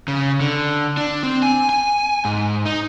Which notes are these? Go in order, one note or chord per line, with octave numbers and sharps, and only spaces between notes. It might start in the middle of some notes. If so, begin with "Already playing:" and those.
C#3
D3
D4
C4
G#5
G#5
G#2
D#4